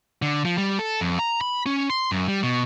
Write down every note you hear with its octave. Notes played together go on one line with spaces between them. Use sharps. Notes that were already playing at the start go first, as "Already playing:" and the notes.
D3
F3
G3
A4
F2
A#5
B5
C#4
C6
F#2
G3
B2